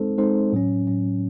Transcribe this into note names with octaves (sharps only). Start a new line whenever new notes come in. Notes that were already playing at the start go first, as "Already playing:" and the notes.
Already playing: G#3 C4 D#4 A4 C5
G#3 C4 D#4 A4 C5
A2 F#3 C#4
A2 F#3 C#4